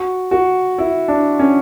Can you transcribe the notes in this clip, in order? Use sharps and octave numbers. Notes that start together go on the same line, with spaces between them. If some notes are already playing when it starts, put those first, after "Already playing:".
Already playing: F#4
F#4
E4
D4
C#4